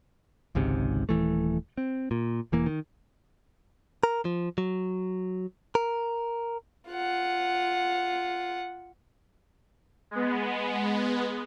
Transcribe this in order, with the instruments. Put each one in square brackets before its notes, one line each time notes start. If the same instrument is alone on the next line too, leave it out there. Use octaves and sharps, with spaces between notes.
[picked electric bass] G#1 C#2 G#2 C3
D#1 E2 E3 A3
C4
A#2
E1 E3 A#3
D#3
[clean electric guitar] A#4
F3
F#3
A#4
[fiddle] F4 F#5
[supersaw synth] G#3 B3